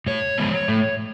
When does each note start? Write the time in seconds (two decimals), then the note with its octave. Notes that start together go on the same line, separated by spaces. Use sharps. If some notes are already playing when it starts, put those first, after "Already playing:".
0.07 A2 C#5
0.38 F3 G#3 B3
0.68 A2